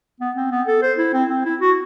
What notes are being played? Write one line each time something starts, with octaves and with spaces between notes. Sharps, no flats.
B3
C4
B3
A4
C5
E4
C4
C4
E4
F#4